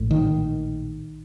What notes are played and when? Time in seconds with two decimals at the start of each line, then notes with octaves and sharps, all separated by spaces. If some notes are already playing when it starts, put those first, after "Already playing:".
Already playing: A#1 A2
0.11 D#3